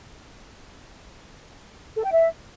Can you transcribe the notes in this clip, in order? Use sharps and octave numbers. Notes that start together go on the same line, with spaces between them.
A4
G5
E5